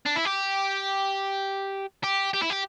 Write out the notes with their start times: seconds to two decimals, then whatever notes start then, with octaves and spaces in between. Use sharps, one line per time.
0.06 D4
0.16 E4
0.25 G4
2.04 G4
2.33 G4
2.42 E4
2.50 G4